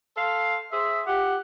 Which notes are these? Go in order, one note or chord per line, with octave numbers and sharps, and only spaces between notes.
A4 C5 F5
G#4 C5 E5
F4 G4 F#5